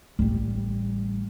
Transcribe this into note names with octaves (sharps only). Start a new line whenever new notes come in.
A1 G3